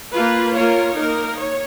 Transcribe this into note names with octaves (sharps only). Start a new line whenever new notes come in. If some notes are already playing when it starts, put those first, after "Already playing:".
A#3 F4 B4
A#3 F4 A#4 C#5
A#3 D#4 A#4
C#5